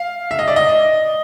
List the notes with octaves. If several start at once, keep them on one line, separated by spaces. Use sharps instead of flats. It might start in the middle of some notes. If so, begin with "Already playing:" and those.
Already playing: F5
E5
D#5
D5
D#5